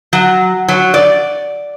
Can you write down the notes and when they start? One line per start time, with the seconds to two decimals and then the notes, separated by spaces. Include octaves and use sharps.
0.13 F#3
0.68 F#3
0.94 D5